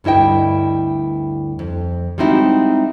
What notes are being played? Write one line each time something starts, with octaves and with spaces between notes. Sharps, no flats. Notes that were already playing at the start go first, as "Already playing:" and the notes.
D2 G2 E4 D#5 G5
F2
G3 G#3 C4 D#4 E4 F#4